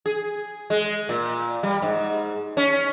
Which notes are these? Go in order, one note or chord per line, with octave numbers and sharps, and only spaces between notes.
G#4
G#3
A#2
G3
G#2
C#4